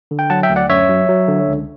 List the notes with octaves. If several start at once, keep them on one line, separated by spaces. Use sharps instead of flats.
D3
G5
F#3 F#5 A5
E5 G5
D2
D5 F#5
F#2 C#5 E5
F#3
F#3
D3
C#2